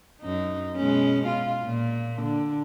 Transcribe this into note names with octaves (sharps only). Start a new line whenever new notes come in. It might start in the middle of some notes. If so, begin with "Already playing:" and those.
F#2 D#4
B2 G#3 C#4
F4
A#2
D3